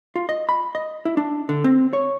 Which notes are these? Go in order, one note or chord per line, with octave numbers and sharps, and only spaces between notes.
F4
D#5
B5
D#5
E4
D4
D3
C4
C#5